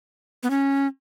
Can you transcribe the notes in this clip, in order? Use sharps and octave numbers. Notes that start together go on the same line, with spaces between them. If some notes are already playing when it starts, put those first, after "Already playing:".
B3
C#4